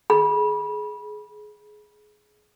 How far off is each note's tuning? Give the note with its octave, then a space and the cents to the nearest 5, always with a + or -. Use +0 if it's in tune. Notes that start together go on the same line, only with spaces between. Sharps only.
G#4 +15 B5 -25